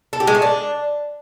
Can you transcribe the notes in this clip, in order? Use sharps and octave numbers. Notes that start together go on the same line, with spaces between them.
A4
G4
G#3
A3
D4